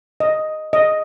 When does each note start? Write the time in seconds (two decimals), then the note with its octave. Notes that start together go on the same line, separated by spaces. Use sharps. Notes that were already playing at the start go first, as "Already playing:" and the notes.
0.20 D#5
0.73 D#5